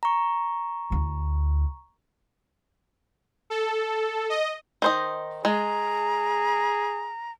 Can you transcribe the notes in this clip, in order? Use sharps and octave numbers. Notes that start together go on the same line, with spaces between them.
A#5 C#6
D2 E4
A4
D#5
D#3 C5 D#5
G#3 G#4 A#5